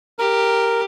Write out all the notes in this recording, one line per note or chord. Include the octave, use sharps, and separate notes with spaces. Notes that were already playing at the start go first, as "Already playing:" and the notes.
G4 A#4